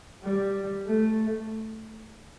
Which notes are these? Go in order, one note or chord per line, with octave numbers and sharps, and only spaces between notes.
G3
A3